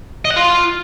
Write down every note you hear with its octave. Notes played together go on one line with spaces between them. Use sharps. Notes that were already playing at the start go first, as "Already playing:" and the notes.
D#5
F#5
F4